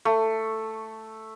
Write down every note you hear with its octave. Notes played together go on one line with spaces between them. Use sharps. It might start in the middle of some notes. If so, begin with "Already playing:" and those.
A3